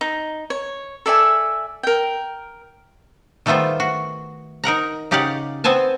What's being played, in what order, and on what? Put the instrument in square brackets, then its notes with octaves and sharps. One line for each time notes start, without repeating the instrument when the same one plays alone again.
[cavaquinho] D#4
C#5
A4 D5 E5 G#5
A#4 G5
[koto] D#3 G3 A3 B3 F4 C5
F#4
D#4 A#4 F#5 A#5
C#3 D#4 G4 D5 F5 F#5
B3 C4 C5 G#5 A5